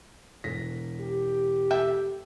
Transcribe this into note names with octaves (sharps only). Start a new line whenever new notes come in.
E1 A#6 B6
G4
A4 E5 G5